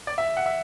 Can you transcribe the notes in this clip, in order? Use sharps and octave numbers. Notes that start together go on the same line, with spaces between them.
D5
E5
F#5
E5